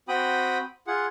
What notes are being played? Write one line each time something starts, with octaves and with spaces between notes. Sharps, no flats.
C4 F#4 G5 B5 D#6
F4 G#4 F#5